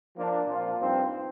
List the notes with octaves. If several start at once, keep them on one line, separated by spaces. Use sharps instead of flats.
F3 A#3 D4
A#2 F3 C4 F4
G2 F3 C4 D#4